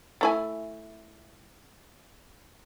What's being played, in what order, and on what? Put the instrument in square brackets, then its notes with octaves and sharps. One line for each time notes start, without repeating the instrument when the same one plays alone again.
[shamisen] A3 E4 G#5